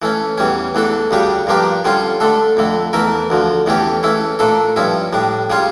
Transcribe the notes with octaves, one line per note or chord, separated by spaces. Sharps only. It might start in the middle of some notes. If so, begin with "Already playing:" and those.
E3 A3 C#4
E2 E3 G3 C#4
E2 E3 A3 D4 A4
D2 C#3 G3 D4 G4
G2 F3 A#3 D4 G4
D3 G3 C#4 F4
D3 A3 D4 A4
F2 D3 A3
E2 E3 A3 E4 A#4
D2 D3 F3
E2 E3 A3 C#4 G4
E3 A3 C#4 E4
A#2 A3 D4 A4
G2 F3 C#4 E4
A2 G3 D4
C#3 G3 C#4 F4